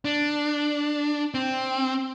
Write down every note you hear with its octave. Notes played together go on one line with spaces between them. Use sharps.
D4
C4